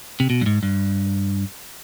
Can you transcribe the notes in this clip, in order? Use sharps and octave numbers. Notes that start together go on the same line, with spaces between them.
C3
B2
G2
G#2
G2